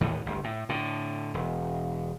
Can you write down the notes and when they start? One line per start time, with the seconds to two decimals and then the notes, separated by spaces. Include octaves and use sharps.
0.01 D#2 A2 D#3 E3
0.26 G1 D2
0.44 A2
0.69 A2 D3
1.34 E1